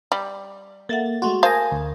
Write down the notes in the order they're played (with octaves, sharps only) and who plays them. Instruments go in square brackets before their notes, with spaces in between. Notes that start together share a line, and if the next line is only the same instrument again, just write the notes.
[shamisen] G3
[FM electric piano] A#3 A6 [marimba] A4 E5 F#5
[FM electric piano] G#3 A3 F#4 [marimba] C6
[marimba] A#4 D#6 A#6 [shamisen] C5 F5 [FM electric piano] G#5 A5
[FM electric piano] D2